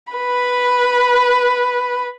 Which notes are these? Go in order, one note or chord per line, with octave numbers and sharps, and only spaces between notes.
B4 B5